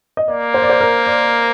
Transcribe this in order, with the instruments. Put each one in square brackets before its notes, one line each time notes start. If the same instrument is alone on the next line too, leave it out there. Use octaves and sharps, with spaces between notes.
[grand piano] D#5
[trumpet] A#3 [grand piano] D5
[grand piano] C5
D5
C5
A#4
D5